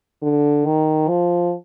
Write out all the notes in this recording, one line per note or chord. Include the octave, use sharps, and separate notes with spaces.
D3
D#3
F3